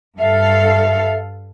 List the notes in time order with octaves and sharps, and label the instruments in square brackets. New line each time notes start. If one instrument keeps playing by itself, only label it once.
[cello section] G2 A4 F5 [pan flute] E5